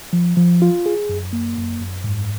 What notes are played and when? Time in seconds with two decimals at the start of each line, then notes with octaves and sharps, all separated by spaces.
0.13 F3
0.37 F3
0.62 F4
0.86 G#4
1.09 F#2
1.33 A#3
1.57 F#2
1.80 F#2
2.04 G#2